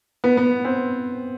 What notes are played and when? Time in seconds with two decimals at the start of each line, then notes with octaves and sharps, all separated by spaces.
0.24 B3
0.37 B3
0.65 C4